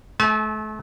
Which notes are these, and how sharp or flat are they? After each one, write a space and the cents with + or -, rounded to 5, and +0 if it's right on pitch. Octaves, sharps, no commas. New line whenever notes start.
A3 -35 G#5 +45